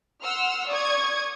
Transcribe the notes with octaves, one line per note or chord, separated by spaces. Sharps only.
F#5 C6 E6 F6
D5 C#6 D#6 G#6